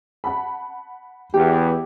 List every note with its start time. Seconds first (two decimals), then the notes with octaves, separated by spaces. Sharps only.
0.24 F#5 A5 B5
1.34 E2 G4